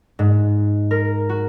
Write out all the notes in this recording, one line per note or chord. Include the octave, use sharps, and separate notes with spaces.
G#2
A#4
F#4